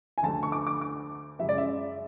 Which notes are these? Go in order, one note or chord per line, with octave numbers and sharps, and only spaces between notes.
G#5
D2 D3 A3 A5
C#6
D6
D6
D6
F#2 C#3 G#3 E5
D5
E5